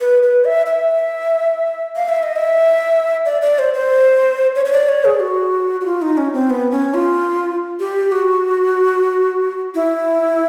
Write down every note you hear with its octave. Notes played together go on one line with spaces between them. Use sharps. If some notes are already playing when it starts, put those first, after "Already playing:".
B4
B4
E5
E5
F5
E5
D#5
E5
D5
D5
C5
C5
C#5
C#5
D5
C#5
G#4
F#4
F#4
F4
D#4
C#4
C4
B3
C#4
F4
G4
F#4
E4